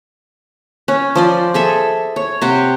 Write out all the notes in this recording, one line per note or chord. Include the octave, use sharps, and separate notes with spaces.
C#4
F3 C5 D5
G#4 A4 E5
C#5
C3 C5 F#5